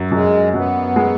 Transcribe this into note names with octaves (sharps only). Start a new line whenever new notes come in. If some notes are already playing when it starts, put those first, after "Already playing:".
Already playing: F#2
F#2 G#3
F#2 B3
G#3